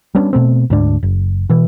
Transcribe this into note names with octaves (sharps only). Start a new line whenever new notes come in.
G3 B3 C#4 D4
B2 A3 C4
D2 G#2 D4
F#1
B2 E3